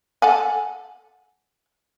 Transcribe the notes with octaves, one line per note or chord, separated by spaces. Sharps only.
A4 F#5 G#5